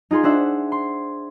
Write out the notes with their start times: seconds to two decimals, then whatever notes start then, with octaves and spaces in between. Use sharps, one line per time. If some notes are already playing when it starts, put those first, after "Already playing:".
0.11 D#4 F4 G#4 C6
0.23 D4 C5 E5 F#5
0.72 C6